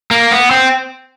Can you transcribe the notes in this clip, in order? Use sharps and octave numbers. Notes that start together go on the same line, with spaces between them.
A#3
B3
C4